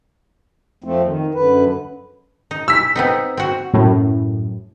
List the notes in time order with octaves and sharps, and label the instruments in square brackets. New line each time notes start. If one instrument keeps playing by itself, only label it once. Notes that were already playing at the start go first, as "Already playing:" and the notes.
[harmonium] F2 F3 A3 C4
D#3
F#2 D3 B4
[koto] D#4
[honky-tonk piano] E6 B6
[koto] B3 C4 D#4
C4 F#4
[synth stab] F#2 A2